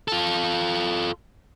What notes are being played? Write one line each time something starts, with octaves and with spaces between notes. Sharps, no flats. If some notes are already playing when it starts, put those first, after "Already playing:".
F4 A4